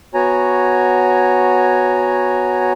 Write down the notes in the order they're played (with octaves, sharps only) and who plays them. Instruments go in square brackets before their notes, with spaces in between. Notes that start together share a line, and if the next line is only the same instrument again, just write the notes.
[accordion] B3 F#4 C#5 G#5 A#5